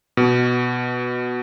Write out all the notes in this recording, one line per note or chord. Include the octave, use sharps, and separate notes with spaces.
B2